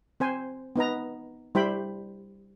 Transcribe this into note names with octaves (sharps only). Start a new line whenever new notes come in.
C4 C5 G#5
B3 D#4 B4 A#5
G3 E4 C5 G5 B5